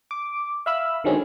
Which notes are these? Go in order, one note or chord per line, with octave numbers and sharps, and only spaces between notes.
D6
E5 F5 B5 E6
D3 D#3 F#3 G#3 C4 C#4